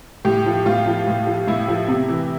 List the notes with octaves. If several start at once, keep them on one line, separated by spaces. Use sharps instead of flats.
A2 G4
F3
A2 F4
F3
A2
F3
A2 E4
F3
C3
E3